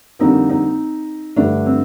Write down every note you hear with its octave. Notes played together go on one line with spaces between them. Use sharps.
F2 D3 G3 A#3 C4 D#4
C4 D#4
G2 D3 A3 D4
C4